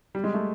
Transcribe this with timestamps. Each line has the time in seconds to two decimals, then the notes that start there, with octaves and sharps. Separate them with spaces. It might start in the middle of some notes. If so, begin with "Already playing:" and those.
0.15 G3
0.24 G#3
0.34 A3